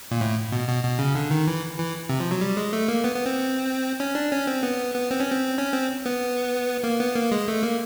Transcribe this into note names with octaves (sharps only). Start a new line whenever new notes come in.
A#2
A2
B2
B2
B2
C#3
D3
D#3
E3
E3
C3
F3
F#3
G3
G#3
A3
A#3
B3
B3
C4
C#4
D4
C#4
C4
B3
B3
C4
C#4
C4
C#4
C4
B3
A#3
B3
A#3
G#3
A3
A#3